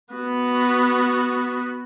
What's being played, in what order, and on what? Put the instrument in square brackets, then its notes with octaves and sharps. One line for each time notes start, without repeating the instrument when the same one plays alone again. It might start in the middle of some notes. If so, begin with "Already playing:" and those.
[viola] B3 F#4